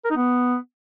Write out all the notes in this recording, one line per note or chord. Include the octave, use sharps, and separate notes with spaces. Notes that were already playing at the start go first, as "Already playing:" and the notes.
A#4
D#4
B3